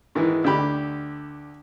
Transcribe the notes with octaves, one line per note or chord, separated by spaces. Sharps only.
G#2 D#3 E3
D2 D3 G4 B5